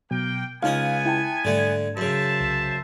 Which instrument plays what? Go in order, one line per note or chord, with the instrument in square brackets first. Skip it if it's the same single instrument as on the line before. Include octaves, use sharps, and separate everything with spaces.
[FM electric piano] B2 F#3 [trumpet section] A#3 G5
[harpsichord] C#2 C#4 D#6 [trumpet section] B3 G#5 [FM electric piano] D#4 F5
[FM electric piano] E4 G5 A5
[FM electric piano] G#2 G3 G#6 [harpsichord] D3 A3
[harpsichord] F#2 C#3 [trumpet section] C5 E5 A5
[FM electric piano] C2